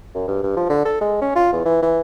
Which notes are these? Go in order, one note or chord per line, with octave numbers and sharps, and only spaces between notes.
F#2
G2
G2
F3
D3
A4
G#3
C#4
F4
E2
E3
E3